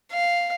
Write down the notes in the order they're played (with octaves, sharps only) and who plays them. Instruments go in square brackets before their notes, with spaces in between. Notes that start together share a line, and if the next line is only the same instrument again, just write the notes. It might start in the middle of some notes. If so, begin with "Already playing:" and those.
[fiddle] F5